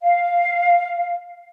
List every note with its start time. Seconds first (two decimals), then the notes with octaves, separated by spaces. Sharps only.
0.01 F5